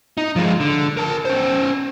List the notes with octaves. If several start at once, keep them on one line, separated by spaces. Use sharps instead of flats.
D#4
F3 G#3
D3
A#4 A5
C#4 C5